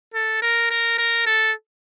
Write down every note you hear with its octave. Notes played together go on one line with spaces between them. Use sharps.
A4
A#4
A#4
A#4
A4